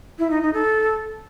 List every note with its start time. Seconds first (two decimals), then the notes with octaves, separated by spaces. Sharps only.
0.19 E4
0.30 D#4
0.42 D#4
0.54 A4